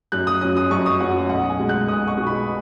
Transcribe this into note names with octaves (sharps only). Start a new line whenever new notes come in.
F#2 F#6
D#6
F#3 C#4 D#6
D#6
F#2 C#6
D#6
F#3 C#4 F#5
B1 F#5
G#5
B2 G#3
F#6
B1 D#6
C#6
B2 G#3
B5